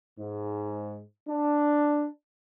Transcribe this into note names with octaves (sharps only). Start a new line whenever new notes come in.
G#2
D4